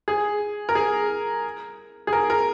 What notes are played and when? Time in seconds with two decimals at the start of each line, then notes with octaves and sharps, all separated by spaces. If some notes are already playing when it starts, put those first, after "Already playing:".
0.08 G#4
0.69 A#4
0.75 G#4
2.07 G#4
2.13 A#4
2.30 A#4